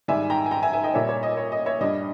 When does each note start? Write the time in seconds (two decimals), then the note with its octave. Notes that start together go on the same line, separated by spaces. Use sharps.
0.08 G#2 D#3 G3 E5 G#5
0.30 G5 A#5
0.46 G#5
0.51 G5 A#5
0.62 E5 G#5
0.73 E5 G#5
0.83 D#5 G5
0.94 A#2 G3 C#5 E5
1.09 C#5
1.23 D#5
1.37 C#5
1.52 D#5
1.66 C#5 E5
1.81 G2 G3 D#5